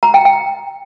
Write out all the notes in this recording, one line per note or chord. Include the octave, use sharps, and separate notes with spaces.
A#5
G5
G5